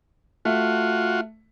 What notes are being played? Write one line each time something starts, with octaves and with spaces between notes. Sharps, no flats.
A3 F4 F#4